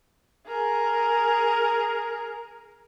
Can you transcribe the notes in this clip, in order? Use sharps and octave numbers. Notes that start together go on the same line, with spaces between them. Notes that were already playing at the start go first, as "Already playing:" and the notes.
G#4 A#4